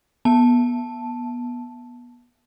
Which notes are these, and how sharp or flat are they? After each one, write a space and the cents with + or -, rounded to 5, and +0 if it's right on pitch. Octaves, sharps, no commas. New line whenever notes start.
B3 -25 A5 +0